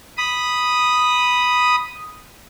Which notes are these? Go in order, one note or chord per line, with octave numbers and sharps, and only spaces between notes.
B5 D#6